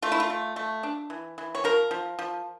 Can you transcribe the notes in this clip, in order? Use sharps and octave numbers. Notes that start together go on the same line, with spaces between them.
A3 F4
E4
F4
A3
A3
D4
E3
E3
C#5
F3 A#4
F3
F3